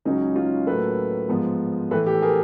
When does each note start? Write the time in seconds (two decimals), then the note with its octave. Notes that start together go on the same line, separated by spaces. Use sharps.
0.05 C#2 C#3 F#3 C#4 D#4
0.36 D#4 F4
0.67 A2 F#3 A#3 A4 B4
1.29 G#2 F3 G#3 B3
1.91 A2 E3 A3 A4 B4
2.06 G4 A4
2.22 G#4 A#4